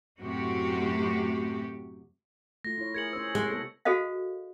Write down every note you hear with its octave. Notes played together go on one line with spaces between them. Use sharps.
F#2 A2 C3 F#4 G4
A3 F4 A#6
E4 C#5
G#4 A#4 G#6 C#7 F#7
C#4 C5 E6
C3 G#3
B3 A4
F#4 G#4 A4 C5 D#5 F5